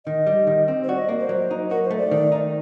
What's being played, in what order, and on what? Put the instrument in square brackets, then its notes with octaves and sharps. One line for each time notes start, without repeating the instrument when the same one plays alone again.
[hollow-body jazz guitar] D#3 [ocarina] D#5
[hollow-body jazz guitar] G3
D#3
C4
[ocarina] C5
[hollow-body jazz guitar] F#4 [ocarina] D5
[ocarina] D#5
[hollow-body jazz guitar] A#3 [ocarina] D5
[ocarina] C5
[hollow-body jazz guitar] F#3
D#4
[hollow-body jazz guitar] F#4 [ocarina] A#4
[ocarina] C5
[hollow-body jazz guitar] A3
[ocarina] D5
[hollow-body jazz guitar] D#3
D#4